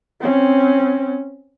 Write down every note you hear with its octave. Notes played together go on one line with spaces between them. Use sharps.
C4 C#4